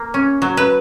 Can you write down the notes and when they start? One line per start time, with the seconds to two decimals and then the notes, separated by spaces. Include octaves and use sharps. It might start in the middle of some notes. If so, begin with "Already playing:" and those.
Already playing: A#3
0.14 C#4
0.42 F#3
0.57 B4